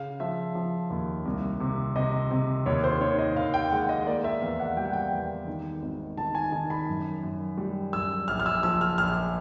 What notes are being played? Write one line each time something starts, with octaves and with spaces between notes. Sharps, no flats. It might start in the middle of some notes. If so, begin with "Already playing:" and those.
Already playing: C#3 F5
F3 E5
F3
D#2
C2
C3
C3 D#5
C3
D#2 C#5
C5
D#3 C#5
D#5
D#2 F5
G5
G#3 F#5
D#5
A#3 D5
E5
E2 F5
F#5
G3 G5
F#5
G5
E2
D#3
G#1
D#3 A5
G#5
D#3 A5
B5
F#2
F#2
G3
F#2 E6
A#1 F6
F6
E6
F3 E6
F6
A#1 F6